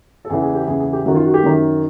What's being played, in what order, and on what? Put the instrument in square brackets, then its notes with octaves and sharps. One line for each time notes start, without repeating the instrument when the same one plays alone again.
[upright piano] A4
E2 C#3 E3 G#4
G#4
G4
E2 C#3 E3 G#4
G#4
G4
F#2 D#3 F#4
F4
F#4
G4
F#2 D#3